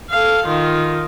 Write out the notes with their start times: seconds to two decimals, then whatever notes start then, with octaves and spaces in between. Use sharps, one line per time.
0.10 A4 F5
0.46 D#3 F4